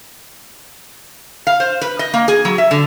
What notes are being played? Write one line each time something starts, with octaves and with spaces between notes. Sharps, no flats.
F5
C5
B4
D#5
A#3
G#4
F#3
E5
D3